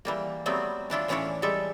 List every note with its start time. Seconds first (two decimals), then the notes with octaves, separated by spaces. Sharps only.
0.05 E3 G3 A#3
0.46 F#3 G3 A3 B3 C4
0.90 E3 D4 E4 F4
1.08 A2 E3 C#4 D4 E4 C#5
1.42 G3 G#3 A4 E5